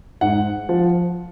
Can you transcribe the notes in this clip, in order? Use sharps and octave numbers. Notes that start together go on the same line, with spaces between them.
G#2 F#5
F3